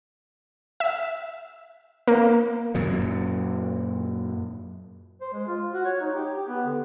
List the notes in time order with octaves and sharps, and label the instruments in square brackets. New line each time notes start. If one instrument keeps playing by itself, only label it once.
[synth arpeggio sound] E5
A#3
[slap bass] F#2 A#2 F#3
[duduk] C5
G#3
F4
F#4
C#5
D#4
G4
G4
B3
D3